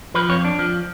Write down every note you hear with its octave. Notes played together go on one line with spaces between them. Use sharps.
F3 B4
F2 C#5
D4
F3